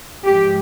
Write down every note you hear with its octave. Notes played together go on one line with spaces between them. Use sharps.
G#2 F3 G#3 G4